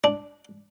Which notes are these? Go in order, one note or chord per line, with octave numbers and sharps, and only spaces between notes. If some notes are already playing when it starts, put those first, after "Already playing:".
D4